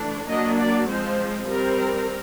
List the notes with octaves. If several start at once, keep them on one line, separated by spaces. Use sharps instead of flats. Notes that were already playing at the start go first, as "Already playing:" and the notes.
Already playing: E3 A3 D4
F#3 A#3 D4 D#5
D5
F3 G#3 C4 C5
G3 C4 A#4